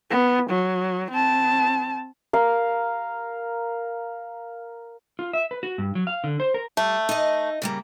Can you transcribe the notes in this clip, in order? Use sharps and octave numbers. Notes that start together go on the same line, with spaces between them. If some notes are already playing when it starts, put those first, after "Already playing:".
B3
F#3
C4 A5
A#4 F5
F4
E5
B4
F#4
G2
F#3
F5
D3
C5
A#4
G3 A3
D#4 D#5
C#3 G3 A#3